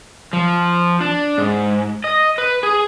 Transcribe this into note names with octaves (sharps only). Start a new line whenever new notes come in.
F3
D4
G#2
D#5
B4
G#4